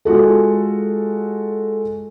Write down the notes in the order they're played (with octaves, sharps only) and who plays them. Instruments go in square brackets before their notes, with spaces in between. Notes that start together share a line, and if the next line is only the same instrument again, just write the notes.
[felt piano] G#3 F4 F#4 A4